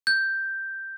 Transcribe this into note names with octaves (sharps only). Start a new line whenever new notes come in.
G6